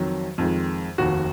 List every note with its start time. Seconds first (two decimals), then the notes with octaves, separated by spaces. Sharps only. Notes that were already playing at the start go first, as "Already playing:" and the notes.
Already playing: F2 D#3 F#3
0.38 F2 D#3 G#3
0.98 F1 D#2 D#3 F#4